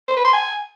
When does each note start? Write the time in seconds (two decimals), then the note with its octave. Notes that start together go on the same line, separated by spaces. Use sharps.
0.08 C5
0.16 B4
0.25 C6
0.33 G#5